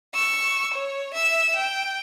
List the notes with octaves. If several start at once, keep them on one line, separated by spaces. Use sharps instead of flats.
C#6 E6
C#5
E5 E6
G5